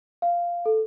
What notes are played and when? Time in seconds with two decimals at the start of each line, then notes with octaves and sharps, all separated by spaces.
0.22 F5
0.66 A4